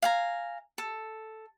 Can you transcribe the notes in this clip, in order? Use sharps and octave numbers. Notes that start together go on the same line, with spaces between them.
F5 G#5 A#5
A4